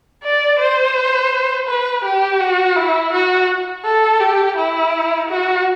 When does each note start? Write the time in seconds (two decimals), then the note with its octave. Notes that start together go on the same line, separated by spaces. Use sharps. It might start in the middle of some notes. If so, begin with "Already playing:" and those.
0.24 D5
0.59 C5
1.68 B4
2.04 G4
2.40 F#4
2.76 E4
3.13 F#4
3.85 A4
4.20 G4
4.57 E4
5.29 F#4